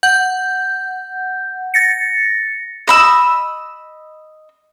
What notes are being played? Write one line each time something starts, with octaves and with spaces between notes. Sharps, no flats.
F#5 G6
A6 A#6 C#7
D#5 B5 E6